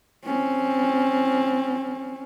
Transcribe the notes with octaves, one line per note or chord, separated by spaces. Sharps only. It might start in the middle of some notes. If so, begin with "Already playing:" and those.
C4 C#4